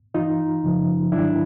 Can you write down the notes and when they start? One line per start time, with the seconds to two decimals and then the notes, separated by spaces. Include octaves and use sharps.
0.14 G2 E3 D#4 F4
0.64 F#2 C#3 F3
1.12 G#2 D#3 F#3 D4 E4